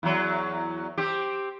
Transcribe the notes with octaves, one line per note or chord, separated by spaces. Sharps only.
E2 F#3
C4 G4